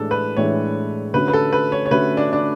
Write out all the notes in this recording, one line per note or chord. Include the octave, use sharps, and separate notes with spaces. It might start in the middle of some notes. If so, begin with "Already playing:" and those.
Already playing: A2 E3 G#3 D4 A4
B4
A2 E3 G#3 D4 C#5
D3 A3 C#4 F#4 B4
B4
A4
B4
C#5
C#5
D3 A3 C#4 F#4 B4
D4
D4